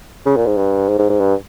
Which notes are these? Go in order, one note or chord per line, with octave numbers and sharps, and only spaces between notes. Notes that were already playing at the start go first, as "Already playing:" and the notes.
C#3
A#2
G#2
G2
G#2
G#2
G#2
G2